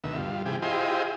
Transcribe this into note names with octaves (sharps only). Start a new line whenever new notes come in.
D2 B2 D#3 E5
G2 F4
C3 E3 G4 G#4
E4 F4 G4 G#4 C5 D#5